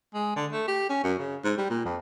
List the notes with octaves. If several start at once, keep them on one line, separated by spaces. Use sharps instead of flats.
G#3
D3
A3
G4
C#4
F#2
C#3
G#2
G3
A#2
F2